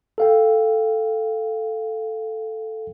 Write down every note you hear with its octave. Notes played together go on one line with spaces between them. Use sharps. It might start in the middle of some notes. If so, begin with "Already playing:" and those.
A4 F5 G5